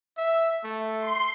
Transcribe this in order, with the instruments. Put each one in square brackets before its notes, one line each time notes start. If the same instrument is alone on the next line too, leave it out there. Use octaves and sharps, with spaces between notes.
[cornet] E5
A3
[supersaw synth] C6